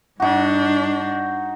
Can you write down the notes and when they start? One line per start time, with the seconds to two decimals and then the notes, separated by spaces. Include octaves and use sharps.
0.20 G2 D4 D#4 F#4